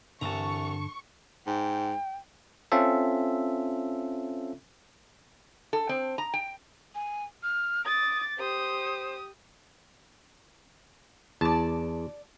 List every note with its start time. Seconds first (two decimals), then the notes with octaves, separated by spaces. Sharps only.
0.21 C2 G2 D3 E3 A5 A#5 C#6
1.47 G#2 G5
2.72 C4 C#4 F4 A4 E5
5.73 A4
5.89 C4
6.18 A#5
6.34 G5
6.95 G#5
7.43 F6
7.85 D6 D#6 A6
8.37 G4 C5 D#6
11.41 E2 D5 A5